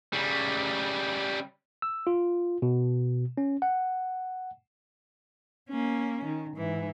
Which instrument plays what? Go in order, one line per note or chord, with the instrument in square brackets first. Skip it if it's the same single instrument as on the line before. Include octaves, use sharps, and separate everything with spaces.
[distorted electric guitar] C#3 G3
[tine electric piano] E6
F4
B2
C#4
F#5
[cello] A#3 C#4
D#3
G#2 E3